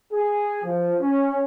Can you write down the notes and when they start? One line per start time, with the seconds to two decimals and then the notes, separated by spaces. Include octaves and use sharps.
0.12 G#4
0.64 F3
0.99 C#4